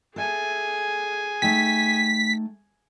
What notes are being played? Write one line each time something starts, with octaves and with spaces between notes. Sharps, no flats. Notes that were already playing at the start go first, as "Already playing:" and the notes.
G#4 A4 E5 G#5
A3 D#4 G5 B6